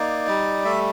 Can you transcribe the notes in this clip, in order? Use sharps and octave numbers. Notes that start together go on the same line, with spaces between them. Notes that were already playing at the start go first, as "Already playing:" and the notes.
Already playing: A#3 D#4 D5
G3
A3 E5